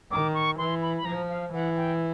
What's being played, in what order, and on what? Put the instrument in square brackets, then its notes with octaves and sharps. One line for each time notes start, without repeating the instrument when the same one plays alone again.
[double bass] D#3 [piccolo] D6
[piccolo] C#6
[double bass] E3 [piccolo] C6
[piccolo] B5
B5
[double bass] F3 [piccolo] A#5
[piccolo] F5
[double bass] E3 [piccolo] F#5
[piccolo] G5